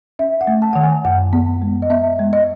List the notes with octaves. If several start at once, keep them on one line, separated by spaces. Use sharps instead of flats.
C#4 E5
F#5
A3
A5
D#3 F#5
G#5
F#2 F#5
B3
G#3
D#5
B3 E5
G#3
D#5